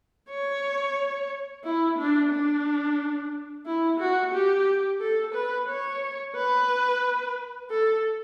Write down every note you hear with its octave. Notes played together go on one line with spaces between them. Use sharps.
C#5
E4
D4
D4
E4
F#4
G4
A4
B4
C#5
B4
A4